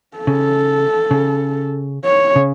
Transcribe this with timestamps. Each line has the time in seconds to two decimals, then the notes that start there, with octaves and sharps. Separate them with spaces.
0.17 A4
0.27 C#3
1.11 C#3
2.05 C#5
2.36 C#3